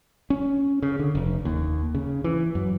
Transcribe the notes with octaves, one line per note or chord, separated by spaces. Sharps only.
C#4
C#3
D3
F1
D#2
C#3
E3
F#2